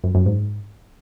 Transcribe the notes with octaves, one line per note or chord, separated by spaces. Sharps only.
F#2
F#2
G#2